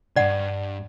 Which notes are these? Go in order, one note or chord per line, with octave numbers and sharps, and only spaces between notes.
C#2 G2 D5 F#5